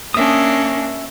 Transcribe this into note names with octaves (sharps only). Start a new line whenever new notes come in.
A#3 C#4 D4 E5 D#6